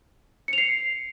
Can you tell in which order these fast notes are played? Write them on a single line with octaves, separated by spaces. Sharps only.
C#7 F7 C7